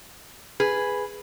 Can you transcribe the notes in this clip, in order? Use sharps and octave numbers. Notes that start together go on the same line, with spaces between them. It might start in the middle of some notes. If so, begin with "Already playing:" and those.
G#4 B4